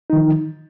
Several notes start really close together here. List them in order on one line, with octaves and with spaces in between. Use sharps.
D#4 D#3 F3